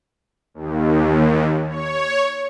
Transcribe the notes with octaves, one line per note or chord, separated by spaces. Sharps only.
D#2
C#5